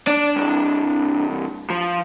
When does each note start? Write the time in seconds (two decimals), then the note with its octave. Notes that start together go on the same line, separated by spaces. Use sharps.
0.07 D4 D5 A5
0.36 C2 G2
1.70 F3